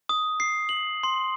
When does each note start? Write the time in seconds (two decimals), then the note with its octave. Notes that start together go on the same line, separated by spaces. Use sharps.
0.09 D#6
0.40 C7
0.69 F#7
1.03 C6